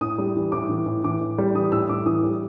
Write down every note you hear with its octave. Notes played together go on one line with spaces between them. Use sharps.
A2 D#6
G3
E3
A2 D6
E3
A2
E3 D6
A2
G3
E3 D#6
A2 E6
A2 D6
E3 D#6
G3